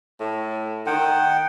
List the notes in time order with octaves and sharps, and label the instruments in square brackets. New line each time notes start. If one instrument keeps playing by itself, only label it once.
[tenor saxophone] A2
[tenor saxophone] D#3 [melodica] F#5 G5